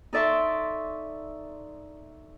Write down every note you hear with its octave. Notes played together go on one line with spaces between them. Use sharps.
D#4 A4 D5 E5 C6 C#6